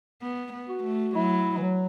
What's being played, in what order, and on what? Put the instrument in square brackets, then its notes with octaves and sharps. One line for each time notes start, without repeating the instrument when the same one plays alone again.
[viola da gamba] B3
B3
[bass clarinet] F#4
[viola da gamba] A3
[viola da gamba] F#3 [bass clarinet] E4
[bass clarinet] E3
F#3